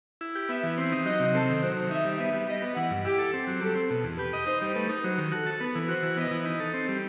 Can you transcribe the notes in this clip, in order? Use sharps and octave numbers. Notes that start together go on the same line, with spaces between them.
E4
G4
B3 E5
E3
C4
D#4
F#3 D#5
C3
C4 A4
D#3
F#3 C5
D#3
D#4 E5
G3
B3 E5
G3
G3 D#5
B3
E3 F#5
G2
E4 G4
A4
C4
F#3
G3 A4
C4
B2 A4
E2
G4 B4
D#5
D#4 C5
G3
A3 B4
D#4
F#3 C5
D#3
F#4 A4
A4
B3 B4
E3
F#4 C5
E3
B3 D#5
E3
D#4
A4
C4
G3